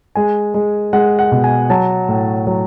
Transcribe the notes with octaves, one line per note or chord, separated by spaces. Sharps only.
G#3 G#5
G#3
G#3 F#5
F#5
B2
G#5
F#3 A5
A2
F#3